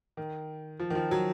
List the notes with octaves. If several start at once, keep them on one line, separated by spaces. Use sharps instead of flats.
D#3
F3
D#3
F3
F#3